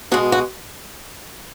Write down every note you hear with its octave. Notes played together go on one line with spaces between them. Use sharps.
B2 G#3 F#4
F#4